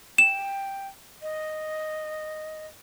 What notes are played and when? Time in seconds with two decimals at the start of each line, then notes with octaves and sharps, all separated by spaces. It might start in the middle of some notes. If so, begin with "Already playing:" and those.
0.18 G5 E7
1.22 D#5